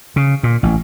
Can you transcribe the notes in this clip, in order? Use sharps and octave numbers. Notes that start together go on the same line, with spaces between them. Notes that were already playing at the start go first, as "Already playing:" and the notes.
C#3
A#2
A1